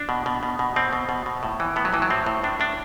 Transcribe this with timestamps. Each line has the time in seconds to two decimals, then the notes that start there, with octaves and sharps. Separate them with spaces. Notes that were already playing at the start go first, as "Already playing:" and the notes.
Already playing: D4
0.09 B2
0.26 B2
0.43 B2
0.59 B2
0.76 B2 C4
0.93 B2
1.09 B2
1.26 B2
1.43 A2
1.60 E3
1.76 A2 B3
1.85 F#3
1.93 A2 E3
2.02 F#3
2.10 A2 C4
2.26 A2
2.43 A2 D4
2.60 A2 D4